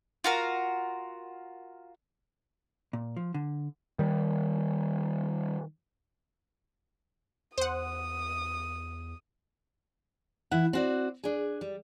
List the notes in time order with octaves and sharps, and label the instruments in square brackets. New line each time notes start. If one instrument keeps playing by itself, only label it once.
[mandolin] F4 F#4 A#4
[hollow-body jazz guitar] A#2
F3
D3
[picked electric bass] D#3 G3
[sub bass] E2 [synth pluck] C5 F#5 [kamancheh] D#6
[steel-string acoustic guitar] E3 E4 F#5
C4 F#4 D5
D4 G#4
G3